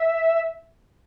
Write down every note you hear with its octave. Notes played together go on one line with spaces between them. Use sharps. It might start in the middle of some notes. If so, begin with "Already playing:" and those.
Already playing: E5